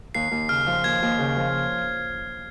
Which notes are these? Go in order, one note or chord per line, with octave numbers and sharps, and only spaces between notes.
D#2 C7
D#2
C#3 F6
F3
D#2 G#6
D#2
C#3
F3